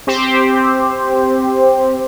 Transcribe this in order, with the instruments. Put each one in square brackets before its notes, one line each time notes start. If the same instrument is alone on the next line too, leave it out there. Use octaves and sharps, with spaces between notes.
[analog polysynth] C4 G4 C5